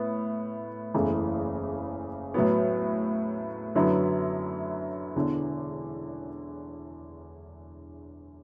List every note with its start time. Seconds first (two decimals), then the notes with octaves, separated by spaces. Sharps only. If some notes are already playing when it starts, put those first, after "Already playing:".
Already playing: A2 B3
0.94 F#1 E2 C#3 E3 A3
2.34 A2 F#3 B3
3.75 F#2 D3 F#3 B3 E4
5.16 E1 E2 D3